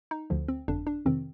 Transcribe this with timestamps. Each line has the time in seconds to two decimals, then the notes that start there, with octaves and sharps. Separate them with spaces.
0.11 D#4
0.30 D2 D3 F3
0.48 C4
0.68 G1 F2 D3 D4
0.87 D4
1.05 F2 C3 D#3 C4